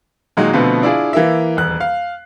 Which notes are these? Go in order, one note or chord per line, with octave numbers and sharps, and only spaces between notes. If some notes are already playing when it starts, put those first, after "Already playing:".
A#2 D#3 F#3 G#3
B2 D3 F3 A3 B3 C4
D4 E4 F4 G#4
E3 A#3 E5
D#1 E2 F#6
F5